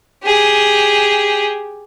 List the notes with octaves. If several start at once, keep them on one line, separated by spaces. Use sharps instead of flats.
G4 G#4